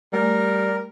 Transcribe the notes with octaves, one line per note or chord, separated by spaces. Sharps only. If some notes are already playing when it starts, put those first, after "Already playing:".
G3 A3 A#4 G#5